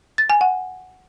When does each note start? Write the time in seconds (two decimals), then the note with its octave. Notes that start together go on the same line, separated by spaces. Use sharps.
0.18 A6
0.30 G#5
0.41 F#5